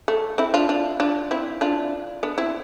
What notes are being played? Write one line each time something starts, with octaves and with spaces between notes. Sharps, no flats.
A3
C4 E4
D4 F4
D4 F4
D4 F4
C4 E4
D4 F4
B3 D4
C4 E4